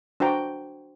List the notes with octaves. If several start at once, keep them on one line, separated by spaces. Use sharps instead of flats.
D4 F#4 C5 G5 A#5